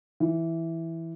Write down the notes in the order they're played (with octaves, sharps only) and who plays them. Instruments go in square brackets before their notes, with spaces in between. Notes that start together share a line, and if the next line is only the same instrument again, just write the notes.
[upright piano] E3